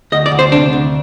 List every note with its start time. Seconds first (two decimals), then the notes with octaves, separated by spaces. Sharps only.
0.12 D2 D#5
0.26 D5
0.32 D2
0.39 C5
0.52 C3 D4
0.73 D2